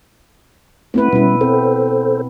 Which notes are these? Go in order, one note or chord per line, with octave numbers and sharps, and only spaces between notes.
A3 B3 C4 E4 B4
B2 G3 C#4 E4
C4 A4 C5